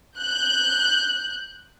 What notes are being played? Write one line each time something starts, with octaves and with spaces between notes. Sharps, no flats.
F#6 G6